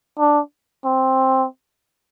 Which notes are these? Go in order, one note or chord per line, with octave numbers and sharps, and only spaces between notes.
D4
C4